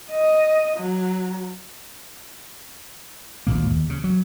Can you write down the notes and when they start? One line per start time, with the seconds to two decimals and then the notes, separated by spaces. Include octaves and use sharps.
0.11 D#5
0.77 F#3
3.47 G#1 D2 A#2 A#3
3.70 D#2
3.89 C#3
4.04 F#3